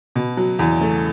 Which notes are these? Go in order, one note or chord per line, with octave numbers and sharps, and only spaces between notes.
B2
F#3
E2
A3